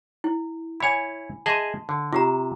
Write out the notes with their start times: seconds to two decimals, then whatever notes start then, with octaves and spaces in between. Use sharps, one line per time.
0.24 E4
0.80 E4 C#5 G#5 B5
1.46 G#4 D#5 E5 A5 C6
1.89 D3
2.13 C3 F4 G4 A#5